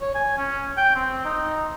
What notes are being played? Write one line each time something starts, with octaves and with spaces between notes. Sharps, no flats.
C#5
G#5
C#4
G5
C4
D#4